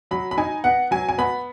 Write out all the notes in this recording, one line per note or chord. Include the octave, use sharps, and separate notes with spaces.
F#3 B5
B5
D#4 G#5
B3 F#5
F#3 G#5
G#5
B3 B5